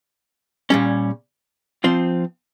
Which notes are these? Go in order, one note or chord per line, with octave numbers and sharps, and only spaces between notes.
A#2 G3 C#4
F3 C4 F4 C5